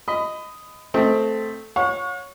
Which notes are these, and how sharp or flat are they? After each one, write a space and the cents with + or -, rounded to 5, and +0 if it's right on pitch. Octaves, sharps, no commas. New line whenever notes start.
D#5 +0 B5 +30
A3 +0 C4 +0 D#5 +30
C#5 +0 F#5 -45